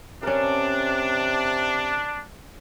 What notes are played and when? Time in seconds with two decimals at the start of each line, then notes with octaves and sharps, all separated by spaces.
0.23 C3 C#4 D4 A#4